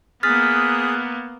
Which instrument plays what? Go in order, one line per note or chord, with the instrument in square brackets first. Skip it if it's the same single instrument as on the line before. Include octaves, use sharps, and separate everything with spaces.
[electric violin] A#3 B3 [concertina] G#4 D#6 F#6 [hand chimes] F6 A6 B6